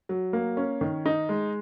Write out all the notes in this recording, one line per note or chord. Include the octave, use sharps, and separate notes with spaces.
F#3
A#3
C#4
D#3
D#4
G#3